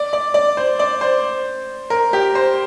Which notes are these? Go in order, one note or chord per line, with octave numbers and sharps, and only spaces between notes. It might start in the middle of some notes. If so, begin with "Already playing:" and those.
Already playing: D5
D5
D5
C5
D5
C5
A#4
G4
C5